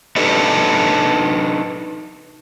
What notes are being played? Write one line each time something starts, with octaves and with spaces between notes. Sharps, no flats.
D4 D#4 G4 A4 B4 D#5